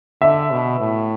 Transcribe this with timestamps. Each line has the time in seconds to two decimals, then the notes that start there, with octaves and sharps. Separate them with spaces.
0.22 D3 E5
0.51 B2
0.80 A2